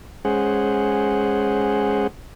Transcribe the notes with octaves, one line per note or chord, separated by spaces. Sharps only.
G#3 C#4 G#4 C5 F#5